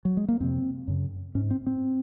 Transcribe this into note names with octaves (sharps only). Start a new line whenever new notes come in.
F#3
G#3
A#3
F2 C3 C4
F#2 C#3
G#2 C#4
C4
C4